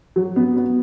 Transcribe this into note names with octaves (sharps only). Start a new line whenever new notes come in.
F#3
B3
B3